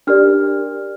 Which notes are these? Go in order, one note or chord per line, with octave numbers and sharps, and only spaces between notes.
D4 G4 A#4 D5 F6